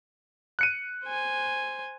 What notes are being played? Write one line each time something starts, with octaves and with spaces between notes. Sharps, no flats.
F#6 C#7 D#7
C5 G#5